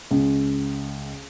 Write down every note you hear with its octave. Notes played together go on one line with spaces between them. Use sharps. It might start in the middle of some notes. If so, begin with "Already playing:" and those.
C#2